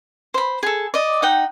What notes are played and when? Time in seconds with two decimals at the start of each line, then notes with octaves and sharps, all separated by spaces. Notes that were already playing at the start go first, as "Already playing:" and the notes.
0.34 C5 B5
0.63 G#4 A4
0.94 D5 D#5
1.22 D#4 F#5 G5